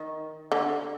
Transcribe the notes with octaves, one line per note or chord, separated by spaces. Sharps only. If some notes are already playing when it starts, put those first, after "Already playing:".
Already playing: D#3
D3